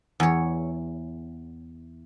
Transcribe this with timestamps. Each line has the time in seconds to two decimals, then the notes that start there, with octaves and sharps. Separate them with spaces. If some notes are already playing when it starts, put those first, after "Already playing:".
0.20 E2 C#5